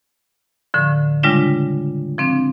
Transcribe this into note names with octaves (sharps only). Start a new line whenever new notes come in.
A2 D3 F3
C#3 G3 G#3 D4 F4
F3 C4 D4